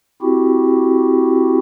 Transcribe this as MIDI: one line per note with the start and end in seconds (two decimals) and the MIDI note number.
0.22 1.59 60
0.22 1.59 64
0.22 1.59 66
0.22 1.59 67